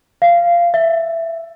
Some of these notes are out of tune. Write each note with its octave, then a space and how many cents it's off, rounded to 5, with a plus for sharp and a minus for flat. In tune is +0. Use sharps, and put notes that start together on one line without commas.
F5 -15
E5 +5